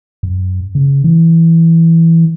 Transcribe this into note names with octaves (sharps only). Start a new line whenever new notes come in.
F#2
C#3
E3